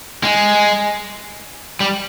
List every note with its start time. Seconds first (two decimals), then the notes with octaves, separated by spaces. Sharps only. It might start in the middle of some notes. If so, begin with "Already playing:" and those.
0.24 G#3
1.80 G3